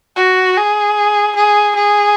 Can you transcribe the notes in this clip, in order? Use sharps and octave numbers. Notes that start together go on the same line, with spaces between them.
F#4
G#4
G#4
G#4